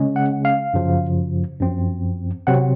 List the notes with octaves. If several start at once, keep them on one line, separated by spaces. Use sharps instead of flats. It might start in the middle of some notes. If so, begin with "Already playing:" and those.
Already playing: C#3 G#3 C#4
F#5
F5
F#2 C#3 F3
F#2 F3 C4
C3 F#3 C4 F#5